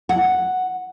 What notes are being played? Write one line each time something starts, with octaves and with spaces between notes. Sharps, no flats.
F#5